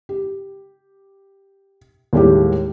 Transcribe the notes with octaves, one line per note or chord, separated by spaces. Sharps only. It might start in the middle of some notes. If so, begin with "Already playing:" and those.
G4
D#2 A2 G3 G#3 G4